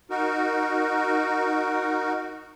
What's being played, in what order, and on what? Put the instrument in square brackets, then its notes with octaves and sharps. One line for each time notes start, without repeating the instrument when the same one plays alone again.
[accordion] D#4 F#4 A#4